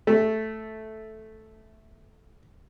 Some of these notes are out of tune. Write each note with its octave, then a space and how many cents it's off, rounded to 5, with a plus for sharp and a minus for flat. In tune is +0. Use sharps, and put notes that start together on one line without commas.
A3 -5